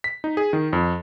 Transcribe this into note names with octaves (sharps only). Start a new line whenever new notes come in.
B6
D#4
G#4
D#3
F2